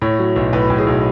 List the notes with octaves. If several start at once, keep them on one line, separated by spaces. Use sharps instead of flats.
A2 C#5
F#3
B1
A2 B4
A2
G#4
B1